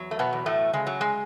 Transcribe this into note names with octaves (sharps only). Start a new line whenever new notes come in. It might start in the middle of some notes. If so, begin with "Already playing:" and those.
Already playing: E2 F#3
A3
B2 B3
E2
A2 A3
C#3 G#3
F#3
G#3